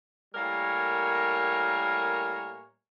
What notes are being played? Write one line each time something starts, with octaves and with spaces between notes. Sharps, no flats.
A2 G3 A#3 A#4 C#5 G#5